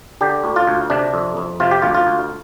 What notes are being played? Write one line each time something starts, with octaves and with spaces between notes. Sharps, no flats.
D3 G4
D2
F4
D2
C3 D4
F2
F2
C3 F4
G4
D2 F4
F4
D2